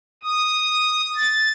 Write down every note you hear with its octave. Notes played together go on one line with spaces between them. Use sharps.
D#6
A6